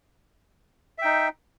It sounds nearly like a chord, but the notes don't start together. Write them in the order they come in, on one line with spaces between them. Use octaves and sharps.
E5 G5 D#4